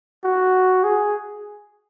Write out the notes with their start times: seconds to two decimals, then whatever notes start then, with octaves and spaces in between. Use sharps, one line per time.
0.24 F#4
0.84 G#4